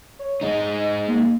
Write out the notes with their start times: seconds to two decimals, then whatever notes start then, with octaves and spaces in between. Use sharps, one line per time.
0.19 C#5
0.41 G#3 D#4 D#5
1.08 A#3